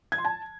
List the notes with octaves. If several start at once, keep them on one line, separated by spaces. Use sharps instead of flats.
G#6
C6
A5